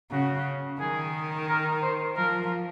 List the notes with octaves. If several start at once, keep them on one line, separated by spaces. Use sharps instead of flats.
C#3 F#4
D#3 G#4
A#4
C5
F3 A#4